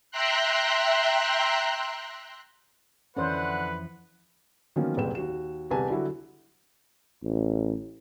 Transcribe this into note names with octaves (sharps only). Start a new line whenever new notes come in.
E5 G5 A#5 C6 F#6
F2 D3 E3 C#4 B4 C5 F#5
D#3 F3 F#3 A#3 B3 C#4
F#1 C2 A#2 B4 G5 E7
D#2 F#4 E7
E1 C2 G4 B4 G#5 A5
D3 F#3 G3 E4 F#4 G4
A1